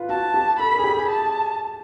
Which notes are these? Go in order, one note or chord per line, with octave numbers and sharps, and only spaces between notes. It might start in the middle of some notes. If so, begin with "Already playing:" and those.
Already playing: F4 B4
F#4 A5
G4
A4 B5
A#4
G#4
G4
G#4
A5